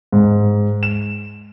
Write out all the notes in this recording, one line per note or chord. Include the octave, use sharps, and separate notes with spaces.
G#2
E7